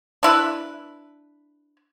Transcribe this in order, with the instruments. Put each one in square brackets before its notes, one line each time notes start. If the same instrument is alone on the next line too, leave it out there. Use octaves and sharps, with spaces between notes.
[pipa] D4 E4 B4